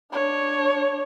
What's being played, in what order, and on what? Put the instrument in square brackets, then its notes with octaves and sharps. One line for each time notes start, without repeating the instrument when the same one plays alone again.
[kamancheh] D4 C#5